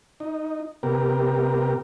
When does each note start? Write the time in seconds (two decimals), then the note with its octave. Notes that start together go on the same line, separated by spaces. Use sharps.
0.20 D#4
0.83 C3 B3 G4 A#4